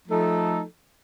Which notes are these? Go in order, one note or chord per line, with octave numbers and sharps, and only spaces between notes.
F3 A3 D#4 A4